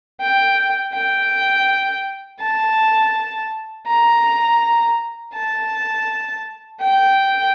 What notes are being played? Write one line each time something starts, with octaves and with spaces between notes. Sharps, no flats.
G5
G5
A5
A#5
A5
G5